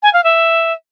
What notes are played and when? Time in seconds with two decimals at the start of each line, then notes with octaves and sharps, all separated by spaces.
0.03 G#5
0.13 F5
0.24 E5